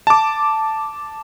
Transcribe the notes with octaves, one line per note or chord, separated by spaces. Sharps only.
A5 D6